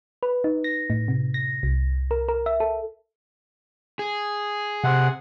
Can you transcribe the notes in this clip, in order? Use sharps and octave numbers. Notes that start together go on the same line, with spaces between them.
B4
D#4
A#6
A2
C3
A#6
C2
A#4
A#4
E5
A4
G#4
C3 F#5